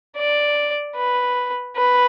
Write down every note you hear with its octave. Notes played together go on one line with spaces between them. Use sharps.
D5
B4
B4